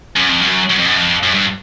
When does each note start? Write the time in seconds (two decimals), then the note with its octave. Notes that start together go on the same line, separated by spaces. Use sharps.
0.16 F#2
0.29 F2
0.42 F#2
0.70 F#2
0.78 F2
0.86 F#2
0.97 F2
1.23 F#2
1.34 G2